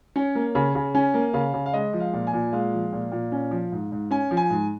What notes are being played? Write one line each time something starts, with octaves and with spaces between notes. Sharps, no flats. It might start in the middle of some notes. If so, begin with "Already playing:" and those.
C#4 C#5
A#3
C#3
C#3
C#4 G#5
A#3
C#3 F5
C#3
F5
G#3 D#5
F3
F5
A#2
G#5
A#2
G#3 F5
F3
A#2
A#2
C#4
F3
G#2
G#2
C#4 G#5
F3
G#5
G#2